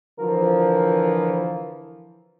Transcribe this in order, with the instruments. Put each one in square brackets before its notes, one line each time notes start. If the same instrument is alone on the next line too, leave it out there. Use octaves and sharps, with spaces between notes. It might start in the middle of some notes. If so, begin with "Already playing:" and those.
[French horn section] D3 E3 F3 [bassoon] A#4